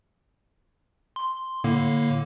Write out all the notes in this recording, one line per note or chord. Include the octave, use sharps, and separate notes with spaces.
C6
A2 D3 A#3